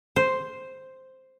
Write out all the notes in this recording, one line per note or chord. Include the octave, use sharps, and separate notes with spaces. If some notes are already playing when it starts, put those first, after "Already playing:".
C5